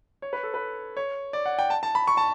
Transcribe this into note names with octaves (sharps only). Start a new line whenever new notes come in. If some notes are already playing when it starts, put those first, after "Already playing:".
C#5
B4
A4
B4
C#5
D5
F#5
G5
A5
A5
B5
C#6
A5